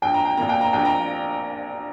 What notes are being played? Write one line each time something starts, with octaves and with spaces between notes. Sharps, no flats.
A#1 G5
A#5
G5
A#2 A#3 A#5
G5
A#5
A#1 G5
A#5